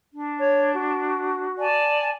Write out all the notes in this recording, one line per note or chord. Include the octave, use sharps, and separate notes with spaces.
D4
C#5
F#4
D5 G#5 A5